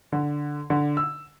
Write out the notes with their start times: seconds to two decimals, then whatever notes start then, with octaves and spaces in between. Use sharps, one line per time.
0.12 D3
0.70 D3
0.97 E6